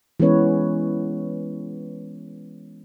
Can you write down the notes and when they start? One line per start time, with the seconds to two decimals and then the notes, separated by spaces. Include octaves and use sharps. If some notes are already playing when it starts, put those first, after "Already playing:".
0.20 E3 G#3 B3 C#4 B4 C#5